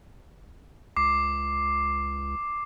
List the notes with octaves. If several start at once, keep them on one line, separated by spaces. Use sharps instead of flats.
C#2 D6 C7